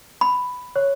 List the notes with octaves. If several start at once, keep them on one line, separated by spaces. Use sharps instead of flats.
B5
C#5